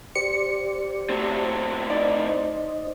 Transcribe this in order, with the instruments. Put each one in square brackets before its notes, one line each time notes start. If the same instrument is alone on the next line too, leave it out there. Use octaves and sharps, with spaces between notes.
[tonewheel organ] G4 C5 D5 [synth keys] C#7
[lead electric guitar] A2 C4
[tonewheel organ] D#4 C5 D#5 [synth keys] D5